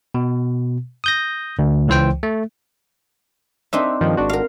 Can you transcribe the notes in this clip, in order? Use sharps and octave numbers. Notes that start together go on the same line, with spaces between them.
B2
D#6 G6 A#6
D2
C#2 E3 C5 G5
A3
C4 D4 D#4 E5
G2 D#3 F3
G#1 D4 F#4
A#4 F5